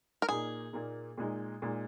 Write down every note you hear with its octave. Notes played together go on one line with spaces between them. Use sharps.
A#4
A#2 A#3 D#4 G#4
A#2 A#3 D#4
A#2 G#3 D#4
A#2 G#3 D#4